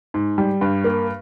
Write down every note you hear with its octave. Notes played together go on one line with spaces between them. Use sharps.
G#2
G3
G2
A#3